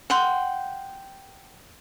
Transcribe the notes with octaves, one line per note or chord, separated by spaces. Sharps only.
F#5 G5 C6